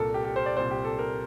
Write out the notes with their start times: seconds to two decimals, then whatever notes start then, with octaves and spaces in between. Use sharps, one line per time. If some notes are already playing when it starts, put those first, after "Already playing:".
Already playing: C2 A#2 A4 A#4
0.14 G4
0.25 G4
0.36 C5
0.46 D5
0.57 C2 A#2 C5
0.71 G4
0.84 A4
0.99 A#4